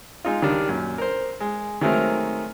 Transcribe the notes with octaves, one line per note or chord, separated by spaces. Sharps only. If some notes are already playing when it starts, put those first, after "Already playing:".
G#3 D#4 F4
C#2 D#3 G3 D4
F#2 A#2
A#4 C5
G#3
D#3 F#3 G#3 A3 C4 A#4